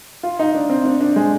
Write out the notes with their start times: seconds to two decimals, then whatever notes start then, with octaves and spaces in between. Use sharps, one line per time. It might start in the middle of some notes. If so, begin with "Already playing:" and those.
0.23 F4
0.39 D#4
0.54 D4
0.70 C4
0.85 D4
1.01 D4
1.16 G#3